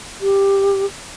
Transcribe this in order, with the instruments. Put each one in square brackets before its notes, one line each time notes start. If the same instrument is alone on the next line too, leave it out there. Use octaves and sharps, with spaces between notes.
[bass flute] G4